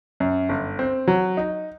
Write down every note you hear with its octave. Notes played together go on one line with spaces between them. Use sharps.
F#2
G1
C4
F#3
D#4